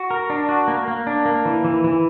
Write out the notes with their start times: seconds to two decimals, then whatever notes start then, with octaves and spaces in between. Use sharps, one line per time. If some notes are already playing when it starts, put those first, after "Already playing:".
Already playing: F#4
0.11 A#4
0.30 D4
0.49 F#4
0.68 A#3
0.88 A#3
1.07 D4
1.26 A#3
1.45 E3
1.65 E3
1.84 E3